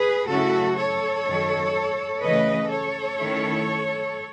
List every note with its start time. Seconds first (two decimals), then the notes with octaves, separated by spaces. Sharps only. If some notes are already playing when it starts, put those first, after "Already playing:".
Already playing: G#4 B4
0.28 C#3 F#3 A3 C#4 E4 F#4 A4
0.77 A4 C#5
1.25 F#2 D#3 F#3
2.22 C#3 E3 A3 C#4 B4 D#5
2.70 A4 C#5
3.18 D#3 A3 C#4 E4